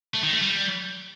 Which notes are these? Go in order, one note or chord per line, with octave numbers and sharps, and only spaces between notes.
A3
D#3
A3
G3